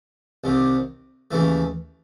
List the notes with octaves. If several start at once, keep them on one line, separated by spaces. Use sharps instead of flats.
C2 C3 D#3
D#2 C#3 E3 A3